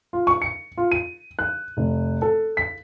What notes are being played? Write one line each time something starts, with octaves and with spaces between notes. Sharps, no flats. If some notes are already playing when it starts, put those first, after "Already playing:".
F4
C#6
C#7
F4
D#7
F#6
F1
A4
B6